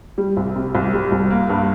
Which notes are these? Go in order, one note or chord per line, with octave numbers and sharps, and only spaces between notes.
G3
C2
C3
C2
G3
C2
A#3
G2